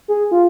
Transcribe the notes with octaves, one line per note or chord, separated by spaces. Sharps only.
G#4
F4